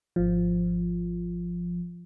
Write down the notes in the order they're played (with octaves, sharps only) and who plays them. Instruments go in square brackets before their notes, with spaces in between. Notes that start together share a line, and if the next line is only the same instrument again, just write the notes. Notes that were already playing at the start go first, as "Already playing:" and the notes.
[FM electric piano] G#1 F3